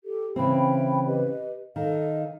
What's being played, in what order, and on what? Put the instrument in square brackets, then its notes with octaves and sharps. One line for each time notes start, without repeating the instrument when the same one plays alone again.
[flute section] G4 A4
[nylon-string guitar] C#3 E3 C4 [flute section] E5 G5 B5
[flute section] G4 B4 D#5
[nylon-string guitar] D#3 [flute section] A4 D#5 F5